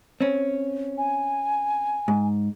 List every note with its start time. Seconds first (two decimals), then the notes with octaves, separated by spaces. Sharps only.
0.21 C4 C#4
0.98 G#5
2.08 G#2